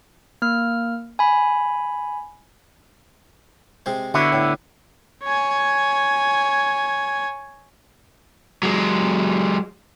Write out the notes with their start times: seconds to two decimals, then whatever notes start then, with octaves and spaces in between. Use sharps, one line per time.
0.42 A#3 F6
1.19 G#5 B5
3.86 C3 G#3 C5
4.14 D3 B3 E4 F#4 C#5
4.33 A2
5.24 C#5 G#5
8.63 F#3 G#3